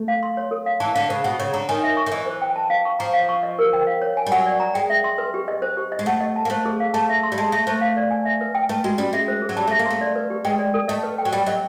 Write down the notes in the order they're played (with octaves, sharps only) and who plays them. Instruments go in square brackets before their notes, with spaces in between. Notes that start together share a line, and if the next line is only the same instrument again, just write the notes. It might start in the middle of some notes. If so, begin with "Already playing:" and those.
Already playing: [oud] A3
[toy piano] F5
C6
C#5
A4
F5
[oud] E3 [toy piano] A5
[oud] D3 [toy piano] F5
[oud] C#3 [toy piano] C5
[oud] B2 [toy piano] F#5
[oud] C#3 [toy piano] C#5
[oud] D3 [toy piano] A#5
[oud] D#3 [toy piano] G#5
[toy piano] E5
C#6
[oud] D#3
[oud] E3 [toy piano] D#5
[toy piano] C5
G5
A5
F5
C#6
[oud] F3 [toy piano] A#5
[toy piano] F5
C#6
D#5
A#4
G5
F5
C#5
G#5
[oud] G3
[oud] F#3 [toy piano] F#5
[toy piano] D5
A#5
[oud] G#3 [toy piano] G5
[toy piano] E5
C6
B4
G4
D#5
C5
G4
D#5
[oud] G#3
[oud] A3 [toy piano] F#5
[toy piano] D#5
A5
[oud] A#3
[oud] A3 [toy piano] C5
[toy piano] G#4
F5
[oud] A3 [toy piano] A5
[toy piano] E5
C6
[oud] G3
[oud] G#3 [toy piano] A5
[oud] A3 [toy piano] E5
[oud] A3 [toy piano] C5
[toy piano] F5
D5
G#5
E5
B4
G5
[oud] A3 [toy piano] B4
[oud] G#3 [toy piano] F#4
[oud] G3 [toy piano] C#4
[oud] G#3 [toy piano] E5
[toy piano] C5
G#4
[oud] F#3
[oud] G3 [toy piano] A5
[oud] A3
[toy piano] E5
[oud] A#3
[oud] A3 [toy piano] C6
[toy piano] D5
B4
G4
[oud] G#3 [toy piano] G5
[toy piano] D5
A4
[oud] A3 [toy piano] D#5
[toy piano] B4
G5
[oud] F#3
[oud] G3 [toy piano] G5
[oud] F#3 [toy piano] D#5